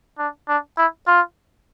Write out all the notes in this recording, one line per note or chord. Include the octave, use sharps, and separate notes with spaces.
D4
D4
E4
F4